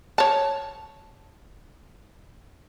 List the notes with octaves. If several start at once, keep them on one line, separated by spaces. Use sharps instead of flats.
C#5 A5